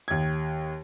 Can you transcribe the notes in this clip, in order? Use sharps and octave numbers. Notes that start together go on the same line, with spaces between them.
D#2 G#6